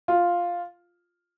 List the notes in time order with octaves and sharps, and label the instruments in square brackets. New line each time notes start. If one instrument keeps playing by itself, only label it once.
[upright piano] F4